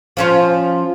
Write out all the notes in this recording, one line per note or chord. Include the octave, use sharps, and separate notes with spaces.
F3 C#4 F4